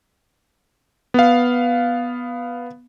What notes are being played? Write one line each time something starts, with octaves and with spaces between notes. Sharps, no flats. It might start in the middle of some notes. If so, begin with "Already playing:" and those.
B3 F5